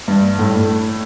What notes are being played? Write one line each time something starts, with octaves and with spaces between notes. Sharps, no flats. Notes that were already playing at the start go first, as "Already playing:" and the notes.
G2
A2